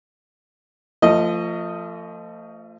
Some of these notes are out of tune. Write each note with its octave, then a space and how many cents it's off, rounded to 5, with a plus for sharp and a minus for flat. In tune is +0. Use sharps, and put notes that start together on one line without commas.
F3 -15 A3 +35 D#5 +0